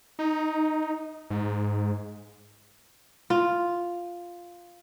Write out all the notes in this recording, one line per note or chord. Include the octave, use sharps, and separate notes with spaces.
D#4
G#2
F4